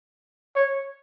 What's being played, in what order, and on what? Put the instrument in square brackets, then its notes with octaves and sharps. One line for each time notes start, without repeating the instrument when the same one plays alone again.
[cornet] C#5